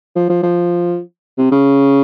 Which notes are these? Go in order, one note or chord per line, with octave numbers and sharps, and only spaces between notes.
F3
F3
F3
C3
C#3